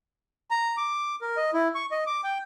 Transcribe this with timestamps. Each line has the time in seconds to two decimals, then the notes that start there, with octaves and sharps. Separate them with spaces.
0.51 A#5
0.77 D6
1.22 A#4
1.37 D#5
1.53 E4
1.75 C#6
1.91 D#5
2.07 D6
2.24 G5